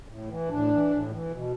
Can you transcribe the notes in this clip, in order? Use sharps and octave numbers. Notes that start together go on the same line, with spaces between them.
A2
E3
A2 D4
E3
A2
E3
B2